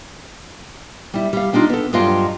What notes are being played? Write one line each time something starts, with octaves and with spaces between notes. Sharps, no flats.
G3 E4
G3 F5
G3 D4 D#4 F4
B3 A4
G2 F#3 F4 D#5 F5 G5